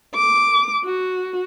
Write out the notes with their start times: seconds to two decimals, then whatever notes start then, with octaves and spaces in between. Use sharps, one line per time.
0.14 D6
0.85 F#4